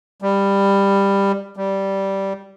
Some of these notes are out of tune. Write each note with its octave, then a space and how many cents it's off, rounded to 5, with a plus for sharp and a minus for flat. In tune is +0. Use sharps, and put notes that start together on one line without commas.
G3 +15
G3 -10